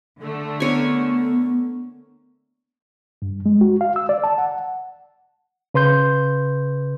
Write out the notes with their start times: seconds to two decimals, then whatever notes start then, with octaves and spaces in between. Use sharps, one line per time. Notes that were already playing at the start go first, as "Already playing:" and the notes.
0.20 D3 A3
0.60 B3 A#4 C#5 G#5
3.22 G2
3.46 G#3
3.61 F#4
3.81 F5
3.96 E6
4.09 D5
4.24 A5
4.38 F#5
5.74 C#3 B4 C6 G6